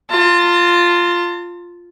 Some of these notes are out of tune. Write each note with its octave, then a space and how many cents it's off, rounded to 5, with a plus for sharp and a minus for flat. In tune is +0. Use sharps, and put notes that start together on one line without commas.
F4 +0 A5 +40